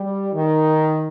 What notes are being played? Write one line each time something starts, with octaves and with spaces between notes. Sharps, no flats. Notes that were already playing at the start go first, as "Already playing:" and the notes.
Already playing: G3
D#3